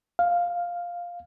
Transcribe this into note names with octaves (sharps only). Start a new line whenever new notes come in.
F5